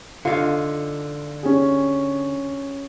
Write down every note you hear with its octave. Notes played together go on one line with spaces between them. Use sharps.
D3 D#4 F4 F5
C#4 G4 G#4